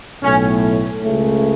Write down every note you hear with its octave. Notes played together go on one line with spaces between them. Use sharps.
B1 A2 A3 C#4
C#2 C#3 A3